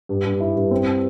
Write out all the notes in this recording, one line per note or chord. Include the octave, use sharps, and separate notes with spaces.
G2
G2
E4
G2
C4